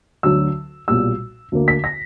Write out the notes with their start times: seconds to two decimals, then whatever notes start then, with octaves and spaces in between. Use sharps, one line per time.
0.23 D2 D3 F#3 E6
0.88 B1 A#2 G3 E6
1.52 D2 D3 A#3
1.68 B6
1.84 A#6